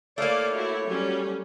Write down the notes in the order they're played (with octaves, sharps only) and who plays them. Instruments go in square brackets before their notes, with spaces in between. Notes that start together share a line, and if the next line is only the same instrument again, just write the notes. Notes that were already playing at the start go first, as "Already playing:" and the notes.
[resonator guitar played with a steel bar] A3 A#3 [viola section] E4 D5 F5 [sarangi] C#5
[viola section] E4 F#4
F#3 G3 C#4